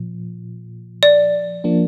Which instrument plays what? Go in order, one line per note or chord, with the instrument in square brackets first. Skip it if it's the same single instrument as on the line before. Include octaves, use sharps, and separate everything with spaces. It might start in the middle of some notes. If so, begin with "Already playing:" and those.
Already playing: [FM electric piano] A#2 F3
[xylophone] D5
[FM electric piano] F3 A#3 D4